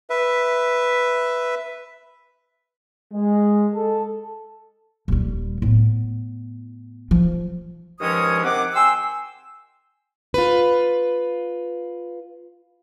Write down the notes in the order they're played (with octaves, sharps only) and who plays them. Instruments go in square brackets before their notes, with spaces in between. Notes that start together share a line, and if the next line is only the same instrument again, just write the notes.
[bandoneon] B4 E5
[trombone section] G#3
A4
[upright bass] D#1 G3
A2 B3
F3
[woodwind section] G2 D#3 F3 G#3 C#4 D#6
C3 D#3 C4 F#5 D6
G5 G#5 C6 E6
[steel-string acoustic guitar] F4 B4